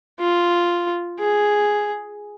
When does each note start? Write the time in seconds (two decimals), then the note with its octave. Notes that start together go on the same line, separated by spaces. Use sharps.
0.20 F4
1.19 G#4